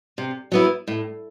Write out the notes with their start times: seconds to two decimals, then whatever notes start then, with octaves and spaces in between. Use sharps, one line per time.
0.18 C3
0.52 F#3 B3 E4
0.88 A2